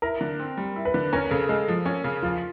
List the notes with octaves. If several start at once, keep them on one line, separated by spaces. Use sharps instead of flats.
E4 A#4
D3
C4
G3
E4
B4
D3
C#4 A#4
C#3 A4
G#3 A4
F3
C#4
C#3
F3 F4